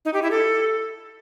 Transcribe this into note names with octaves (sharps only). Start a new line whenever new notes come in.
D#4
G4
E4
A4